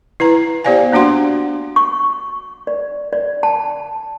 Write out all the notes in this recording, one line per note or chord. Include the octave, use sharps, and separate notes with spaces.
E4 B4 A#5
B3 G4 C5 D5 F5 G#5
A#3 D4 F#4 F#5 C6
C#6
D5
D5
A5